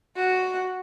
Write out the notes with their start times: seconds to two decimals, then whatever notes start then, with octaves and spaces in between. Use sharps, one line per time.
0.17 F#4